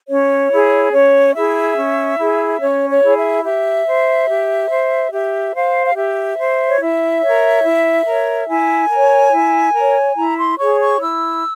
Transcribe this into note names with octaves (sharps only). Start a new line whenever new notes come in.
C#4 C#5
E4 G#4
C#4 C#5
E4 G#4 E5
C#4
E4 G#4
C#4 C#5
C#5
E4 G#4
E5
G4 E5
C5
G4
C5
G4 E5
C5 F5
F5
G4 E5
C5
C#5
E4 E5
A#4 C#5
E4
A#4 C#5
E4 G#5
A#4 C#5
E4
A#4 C#5
E4 A#5
C6
G#4 C#5 C#6
C#6
E4 E6